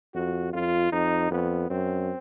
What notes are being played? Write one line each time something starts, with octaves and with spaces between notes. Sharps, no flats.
F2 F#4
F2 F4
F2 D#4
F2 B3
F#2 C4